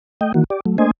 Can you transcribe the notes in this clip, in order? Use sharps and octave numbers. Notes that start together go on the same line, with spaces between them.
A3 D#5 G5
D#3 E3 A#3 F#4
G4 D5
F#3 A3
A3 A#3 D4 C5 D#5 G#5